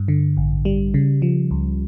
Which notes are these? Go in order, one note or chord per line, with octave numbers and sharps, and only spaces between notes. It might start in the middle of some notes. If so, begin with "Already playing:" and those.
Already playing: G2
D3
A1
G3
C#3
F3
C#2